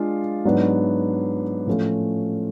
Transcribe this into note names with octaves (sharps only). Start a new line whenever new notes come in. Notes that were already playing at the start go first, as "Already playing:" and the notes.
Already playing: G#3 D4 F4
G#2 F#3 B3 D4
A2 F3 A3 C#4 F4